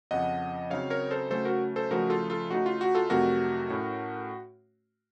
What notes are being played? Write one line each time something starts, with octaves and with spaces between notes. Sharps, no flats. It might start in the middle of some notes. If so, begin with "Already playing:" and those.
F2 C#3 F3 D#5 F#5
C#3 F#3 C4 D#4 C#5 F5
A#4 C#5
A4 C5
C#3 F#3 A3 C#4 A4 C5
F#4 A#4
A4 C5
C#3 F3 A3 D#4 F#4 A#4
F4 A4
F4 A4
C#3 A3 D#4 F#4
F4
F#4
F4 A4
F2 C3 F#3 A3 D#4 F#4 A#4
A2 A3 C#4